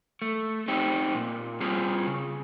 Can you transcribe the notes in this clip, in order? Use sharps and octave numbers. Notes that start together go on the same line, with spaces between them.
A3
C4 D#4 G4
A#2
G3 C4 F4 G#4
C#3